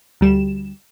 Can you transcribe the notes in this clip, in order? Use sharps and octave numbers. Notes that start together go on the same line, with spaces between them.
D2 G3 E7